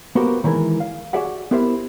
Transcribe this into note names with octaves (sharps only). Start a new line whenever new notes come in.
A#3 B3 F#4 G4 A#4 C5
D#3 E3 G#3 A#4 G#5
F5
F#4 G#4 D5 E5 F#5
B3 E4 G4 A#4 C5 E5